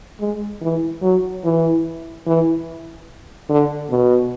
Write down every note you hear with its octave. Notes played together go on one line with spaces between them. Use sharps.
G#3
E3
F#3
E3
E3
D3
B2